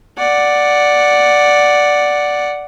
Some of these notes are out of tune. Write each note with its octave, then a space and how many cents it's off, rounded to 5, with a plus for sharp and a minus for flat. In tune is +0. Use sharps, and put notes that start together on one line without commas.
D5 +0 F#5 +0